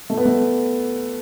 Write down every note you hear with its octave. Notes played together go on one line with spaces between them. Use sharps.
A3
B3
A3